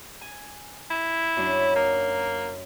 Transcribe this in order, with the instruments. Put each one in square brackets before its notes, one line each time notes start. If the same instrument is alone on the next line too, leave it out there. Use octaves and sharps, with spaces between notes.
[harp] G#5
[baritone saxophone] E4
[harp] F#2 F#3 D4
[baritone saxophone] A#3 [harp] D#4